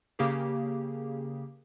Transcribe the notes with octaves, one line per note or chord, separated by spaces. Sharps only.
C#3 A#3 G4 G#4